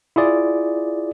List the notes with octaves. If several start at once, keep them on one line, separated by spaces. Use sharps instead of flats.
E4 F4 G#4 D5